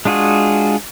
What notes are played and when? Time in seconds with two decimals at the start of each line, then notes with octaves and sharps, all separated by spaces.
0.05 G#3 D4 F4 F#4 G#4